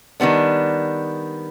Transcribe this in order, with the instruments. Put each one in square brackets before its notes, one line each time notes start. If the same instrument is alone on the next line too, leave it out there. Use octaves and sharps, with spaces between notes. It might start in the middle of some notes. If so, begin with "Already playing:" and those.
[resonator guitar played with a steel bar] D#3 G3 B3 D4